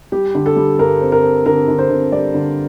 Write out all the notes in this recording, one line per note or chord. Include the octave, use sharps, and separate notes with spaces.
G3 G4
D3
A4
G3
G2 A#4
C4
A#4
C4
D3 A#4
D3
C5
D3
G3 D5
D3